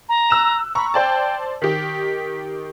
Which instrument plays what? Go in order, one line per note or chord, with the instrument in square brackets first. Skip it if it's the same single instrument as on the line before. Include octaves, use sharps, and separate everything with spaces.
[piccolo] A#5
[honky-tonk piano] E6 F#6 E7
[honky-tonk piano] A#5 C#6 [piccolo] B5
[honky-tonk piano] C5 D5 A5 [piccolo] G5
[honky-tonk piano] D#3 G4 [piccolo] B6